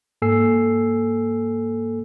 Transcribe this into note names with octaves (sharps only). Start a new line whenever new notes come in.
G#2 A#3 A4 G#5 E6 C7